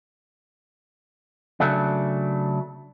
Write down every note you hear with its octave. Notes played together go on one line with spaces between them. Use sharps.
C#3 F#3 A3 D4